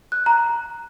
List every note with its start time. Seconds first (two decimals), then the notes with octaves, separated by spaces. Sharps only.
0.12 F#6
0.26 A#5